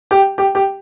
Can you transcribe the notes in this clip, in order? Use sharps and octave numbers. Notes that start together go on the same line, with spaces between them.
G4
G4
G4